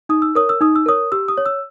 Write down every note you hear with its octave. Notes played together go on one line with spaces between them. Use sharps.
D#4 D#6
E6
A#4 C#5 D#6
E6
D#4 D#6
E6
A#4 C#5 D#6
G4 E6
D#6
C#5
E6